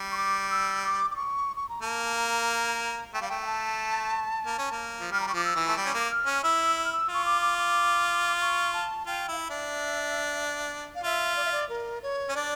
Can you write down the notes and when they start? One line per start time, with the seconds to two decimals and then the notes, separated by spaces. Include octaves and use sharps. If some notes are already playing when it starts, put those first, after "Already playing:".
Already playing: G3
0.12 C#6
0.17 D6
0.51 E6
0.83 D6
1.11 D6
1.16 C#6
1.56 C#6
1.69 A#5
1.82 A#3 A5
2.06 A5
2.16 A#5
3.14 A3 G5
3.21 G3 F5
3.29 A3 G5
3.42 G5
3.46 A5
4.46 A#3
4.58 C#4
4.72 A#3
5.01 F3
5.11 G3 F6
5.21 A#5
5.27 G3 C#6
5.34 F3 D6
5.45 E6
5.56 E3
5.68 A3
5.77 G3 D6
5.85 C#4
5.94 A#3
6.11 F6
6.26 C#4
6.43 E4 E6
6.76 E6
6.85 F6
6.93 E6
7.09 F4
7.14 C#6
7.26 D6
7.41 D6
7.58 D6
8.41 C#6
8.74 A5
9.07 F4 G5
9.28 E4 F5
9.39 E5
9.50 D4
10.95 F5
11.04 F4 E5
11.36 D5
11.45 E5
11.52 D5
11.69 A#4
12.03 C#5
12.29 C#4
12.35 D4 D5